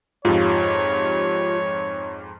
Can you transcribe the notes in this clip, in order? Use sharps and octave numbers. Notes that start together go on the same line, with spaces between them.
F2 G#2 F4 G4 C#5